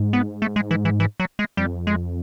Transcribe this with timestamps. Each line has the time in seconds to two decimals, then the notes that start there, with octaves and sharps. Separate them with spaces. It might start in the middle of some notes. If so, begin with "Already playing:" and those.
Already playing: G#2
0.13 B3
0.42 A3
0.56 G#3
0.71 E3
0.85 E3
1.00 E3
1.20 F#3
1.39 G#3
1.57 F2 G3
1.87 G#3